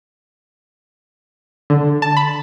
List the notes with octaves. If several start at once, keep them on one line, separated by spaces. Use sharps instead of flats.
D3
A5
B5